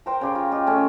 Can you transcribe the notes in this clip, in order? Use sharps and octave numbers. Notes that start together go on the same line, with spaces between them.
A#4 C5 G5 A#5
C#3 G4 C6
F4
F4 G4 D#5
A3 C#4